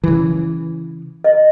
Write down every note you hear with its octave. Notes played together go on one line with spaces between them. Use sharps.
C#3 E3
D#5